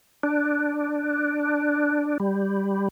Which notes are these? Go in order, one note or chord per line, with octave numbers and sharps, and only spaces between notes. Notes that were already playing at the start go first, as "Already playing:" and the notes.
D4
G3